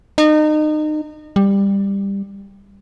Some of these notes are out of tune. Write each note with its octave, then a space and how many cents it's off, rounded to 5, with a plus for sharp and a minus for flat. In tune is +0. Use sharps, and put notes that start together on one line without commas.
D#4 -30
G3 +15